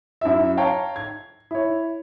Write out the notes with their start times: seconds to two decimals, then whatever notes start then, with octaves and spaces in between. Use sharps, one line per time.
0.21 F#2 E4 E5
0.57 C#5 F5 G5 A5 A#5 C#6
0.96 G#6
1.51 E4 C#5